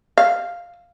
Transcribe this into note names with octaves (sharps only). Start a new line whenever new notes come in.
F5